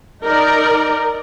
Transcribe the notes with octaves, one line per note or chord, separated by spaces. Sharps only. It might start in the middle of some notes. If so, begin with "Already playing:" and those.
D#4 A#4 D5